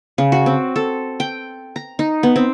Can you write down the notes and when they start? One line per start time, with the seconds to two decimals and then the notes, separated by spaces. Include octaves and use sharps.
0.18 C#3
0.32 F#4
0.46 C4
0.76 A4
1.20 G5
1.76 A#5
1.99 D#4
2.23 B3
2.36 C4